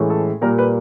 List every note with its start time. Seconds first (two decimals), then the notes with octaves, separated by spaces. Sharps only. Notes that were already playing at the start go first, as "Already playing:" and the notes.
Already playing: A2 E3 G#3 C#4
0.10 A4
0.42 A#2 G3 A#3 A#4
0.58 B4